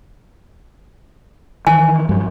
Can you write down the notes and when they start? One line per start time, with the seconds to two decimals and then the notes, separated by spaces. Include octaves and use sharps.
1.67 D#3 E3 G#5
2.09 G2 F3 F#3